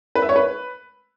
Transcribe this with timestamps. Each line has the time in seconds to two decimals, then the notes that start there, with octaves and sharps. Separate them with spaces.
0.15 B4
0.22 E5
0.29 C#5
0.36 B4